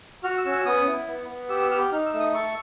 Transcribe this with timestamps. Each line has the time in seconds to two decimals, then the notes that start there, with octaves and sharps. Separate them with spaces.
0.24 F#4 F6
0.38 E6
0.45 C#4
0.52 E6
0.66 B3 D#6
0.87 E4
1.07 B3
1.29 B3
1.49 G4 E6
1.62 E6
1.71 G4 F6
1.92 D#4 F6
2.06 E6
2.14 A3
2.20 D#6
2.34 A4 C#6